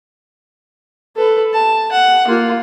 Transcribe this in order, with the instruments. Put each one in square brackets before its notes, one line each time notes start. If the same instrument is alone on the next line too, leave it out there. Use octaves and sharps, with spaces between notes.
[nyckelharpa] A4 B4
A5
F#5
A#3 F4